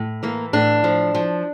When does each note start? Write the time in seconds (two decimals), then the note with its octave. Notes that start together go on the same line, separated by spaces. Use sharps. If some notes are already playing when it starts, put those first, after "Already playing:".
Already playing: A2
0.23 E3 A#3
0.53 A2 D4
0.84 F3
1.15 F3